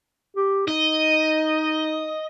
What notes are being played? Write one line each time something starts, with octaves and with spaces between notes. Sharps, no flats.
G4
D#4 D#5